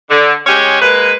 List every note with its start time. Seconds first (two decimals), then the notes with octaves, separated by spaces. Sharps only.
0.10 D3
0.47 G#3 C#4 G4 G#4 C#5
0.82 G#3 A#3 B4